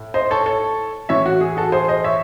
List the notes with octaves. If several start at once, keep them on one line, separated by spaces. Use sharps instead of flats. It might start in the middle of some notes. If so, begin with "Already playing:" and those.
Already playing: A2
C5 D#5
A4 C#5
A4 C#5
A2 E3 C#5 E5
F#4
G#4
F#4 A4
G#4 C5
C5 D#5
C#5 E5